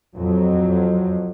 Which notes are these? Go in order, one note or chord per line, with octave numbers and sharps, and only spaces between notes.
F2 F#3